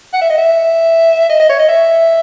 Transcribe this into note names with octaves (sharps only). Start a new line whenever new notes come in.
F#5
E5
D#5
E5
D#5
D#5
C#5
D#5
E5